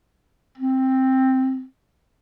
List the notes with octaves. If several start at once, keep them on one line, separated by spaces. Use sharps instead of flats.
C4